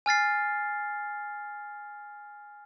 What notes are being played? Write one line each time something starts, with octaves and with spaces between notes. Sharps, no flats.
G#5 F6 A6 C7